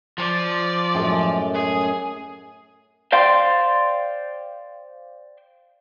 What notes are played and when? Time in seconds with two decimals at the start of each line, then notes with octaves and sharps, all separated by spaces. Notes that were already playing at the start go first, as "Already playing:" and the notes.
0.18 F3 D5
0.95 F#2 A2 G#3
1.54 G#4
3.12 C5 D5 F5 G5 C6